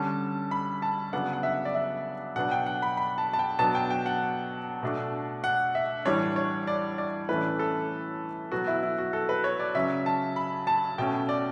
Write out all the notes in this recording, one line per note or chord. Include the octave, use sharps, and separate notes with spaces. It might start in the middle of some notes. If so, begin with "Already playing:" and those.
Already playing: D3 G3 C#4 A5
B5
A5
C#3 F#3 B3 D4 F#5
F#5
E5
D5
E5
B2 F#3 B3 D4 F#5
G5
F#5
B5
B5
A5
A5
G5
B2 F#3 B3 D4 A5
G5
G5
F#5
B2 A3 D4
F#5
E5
A2 E3 G3 D4 C#5
C#5
D5
D5
A2 E3 A3 C#4 B4
A4
B2 F#3 B3 F#4
E4
E4
F#4
A4
B4
C#5
D5
C#3 F#3 C#4 E5
A5
B5
A5
B2 A3 C#4 G5
D5